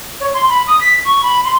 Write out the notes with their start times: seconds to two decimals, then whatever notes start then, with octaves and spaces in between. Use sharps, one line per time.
0.20 C#5
0.33 C6
0.49 B5
0.67 D#6
0.80 B6
1.04 C#6
1.23 B5
1.44 C6